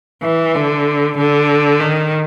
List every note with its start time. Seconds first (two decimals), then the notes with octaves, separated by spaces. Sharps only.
0.23 E3
0.55 D3
1.18 D3
1.80 D#3